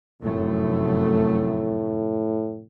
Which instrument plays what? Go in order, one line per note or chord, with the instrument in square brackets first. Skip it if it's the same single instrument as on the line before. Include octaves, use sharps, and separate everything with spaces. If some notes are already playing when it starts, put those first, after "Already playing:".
[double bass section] F1 F#2 A3 [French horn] A2